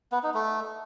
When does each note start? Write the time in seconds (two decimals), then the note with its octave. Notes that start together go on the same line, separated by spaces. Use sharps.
0.12 B3
0.23 D#4
0.34 A3